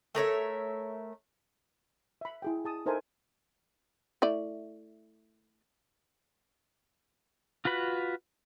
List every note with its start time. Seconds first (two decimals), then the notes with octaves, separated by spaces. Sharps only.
0.15 A3 A#4 C#5 E5
2.21 E5 B5
2.42 E4 G#4 G5
2.65 G#4 A5 D#6
2.86 D#4 A4 A#4 C5 E5 G#5
4.22 A3 E4 D5
7.65 F4 F#4 B4 B5